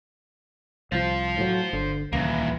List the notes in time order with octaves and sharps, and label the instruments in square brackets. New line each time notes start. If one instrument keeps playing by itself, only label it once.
[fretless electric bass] C2 F3 [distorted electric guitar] C5 F5
[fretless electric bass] A2 F#3
[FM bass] G1 [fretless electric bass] D3
[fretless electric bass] D#1 [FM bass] C#2 [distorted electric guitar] E3 A#3